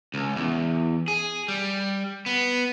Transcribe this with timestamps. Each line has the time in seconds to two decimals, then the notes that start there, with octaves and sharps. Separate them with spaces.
0.14 C#2
0.36 E2
1.08 G#4
1.48 G3
2.26 B3